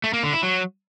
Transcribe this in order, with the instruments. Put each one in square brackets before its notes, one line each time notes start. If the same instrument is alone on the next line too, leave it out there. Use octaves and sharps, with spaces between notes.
[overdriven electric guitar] A3
A#3
D3
E4
F#3